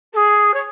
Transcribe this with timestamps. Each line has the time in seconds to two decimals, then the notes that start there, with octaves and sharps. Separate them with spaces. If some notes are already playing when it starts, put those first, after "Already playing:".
0.13 A4
0.16 G#4
0.53 C#5